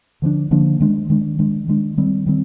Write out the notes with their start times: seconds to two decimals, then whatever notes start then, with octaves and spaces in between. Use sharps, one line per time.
0.22 D3 F3 A#3 D4
0.51 D3 F3 A#3 D4
0.80 D#3 G#3 D4
1.10 D#3 G#3 D4
1.39 D#3 G#3 D4
1.68 D#3 G#3 D4
1.97 D#3 G3 C4
2.26 D#3 G3 C4